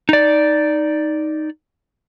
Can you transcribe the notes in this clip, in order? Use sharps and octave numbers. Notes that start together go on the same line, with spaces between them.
D#4 D5